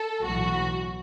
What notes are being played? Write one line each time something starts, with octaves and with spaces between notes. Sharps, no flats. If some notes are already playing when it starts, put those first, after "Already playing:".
Already playing: A4
B1 A2 E3 F#4